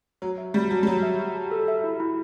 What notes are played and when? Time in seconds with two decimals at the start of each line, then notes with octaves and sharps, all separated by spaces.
0.22 F#3 C#5
0.38 E5
0.54 G3 F#4
0.70 F#3 A5
0.83 G3
0.87 F#3 C#5
1.03 E5
1.19 F#4
1.35 A5
1.51 A4
1.68 E5
1.84 E4
2.00 E4